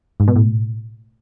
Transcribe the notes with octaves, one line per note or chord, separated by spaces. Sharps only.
G#2
B2
A2